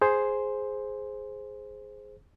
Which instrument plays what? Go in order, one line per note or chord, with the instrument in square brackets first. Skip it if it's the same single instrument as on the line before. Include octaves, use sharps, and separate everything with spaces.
[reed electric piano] G#4 C5